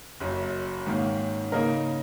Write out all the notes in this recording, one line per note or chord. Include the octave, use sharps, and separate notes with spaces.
F#1 F#2 F#3
G#2 D#3 A#3 C#4
C#3 A#3 D#4 A#4 D#5